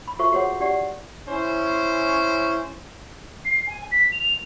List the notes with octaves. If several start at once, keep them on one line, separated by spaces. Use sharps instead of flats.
B5
F4 F#4 A4 C5 E5 C#6
F#4 G#4 C5 C#5 F#5 D6
D4 G4 D5 F#5
C#4 E4 C5
C7
G#5
B6
F7